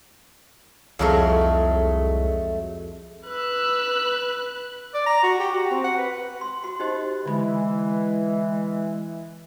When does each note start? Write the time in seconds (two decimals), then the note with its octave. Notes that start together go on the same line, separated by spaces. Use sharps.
0.99 C2 F2 F#3 G#3 A3 A#4
3.25 B4 E6 F#6
4.94 D5
5.06 A#5
5.23 F#4
5.40 G4
5.53 F#4
5.71 C4
5.84 F#5
5.98 B4
6.41 C6
6.64 F#4 C6
6.79 D#4 F#4 G4 C5 D#5
7.26 D3 E3 G#3 B5